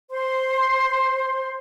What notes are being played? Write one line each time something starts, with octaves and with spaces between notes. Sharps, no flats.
C5 C6